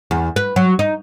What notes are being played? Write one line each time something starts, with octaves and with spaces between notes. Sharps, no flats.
E2
B4
F#3
D#4